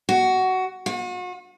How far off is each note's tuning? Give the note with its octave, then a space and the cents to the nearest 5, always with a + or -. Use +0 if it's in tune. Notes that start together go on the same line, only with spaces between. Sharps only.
F#4 +15
F#4 -40